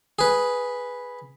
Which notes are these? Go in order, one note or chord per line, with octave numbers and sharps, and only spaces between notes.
G#4 B4